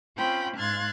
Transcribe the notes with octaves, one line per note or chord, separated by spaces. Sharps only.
C4 C#4 F4 G5 B5
G#2 F5 C6 F#6 G#6 A6